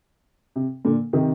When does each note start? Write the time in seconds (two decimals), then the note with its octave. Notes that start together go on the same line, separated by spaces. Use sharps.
0.56 C3
0.85 A#2 D3
1.13 C3 D#3